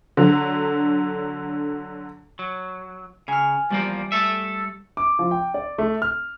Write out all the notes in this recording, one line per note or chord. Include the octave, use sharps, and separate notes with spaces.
D3 F#3
F#3
C#3 G#5 F6
E2 F3 G3 A#3 G4
A3 A4 E5
D6
F3
G5
D5
A3
F6